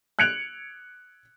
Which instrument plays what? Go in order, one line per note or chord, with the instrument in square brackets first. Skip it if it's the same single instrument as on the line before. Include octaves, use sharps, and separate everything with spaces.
[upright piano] F#6 G#6 C#7 D7 F7 F#7